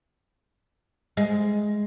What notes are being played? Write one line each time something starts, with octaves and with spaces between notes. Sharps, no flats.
G#3